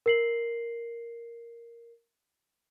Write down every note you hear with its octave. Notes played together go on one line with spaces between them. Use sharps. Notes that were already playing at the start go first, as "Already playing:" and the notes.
A#4 C7 F#7